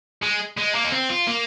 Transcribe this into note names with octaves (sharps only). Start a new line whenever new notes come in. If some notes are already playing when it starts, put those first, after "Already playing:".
G#3
G#3
A#3
D#4
C4
F4
A#3